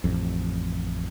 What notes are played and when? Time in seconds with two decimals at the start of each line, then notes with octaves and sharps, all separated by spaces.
0.04 A1 F2